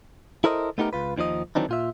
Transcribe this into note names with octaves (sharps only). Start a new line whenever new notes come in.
E4 A4 A#4 C5 D#5
A3 B3 D#4 G4 A#4
C#2 F4 B4
D#2 D#3 F3 D#4 D#5
D#3 E3 F#3 C4 D4 D#4
A#2 F4 E5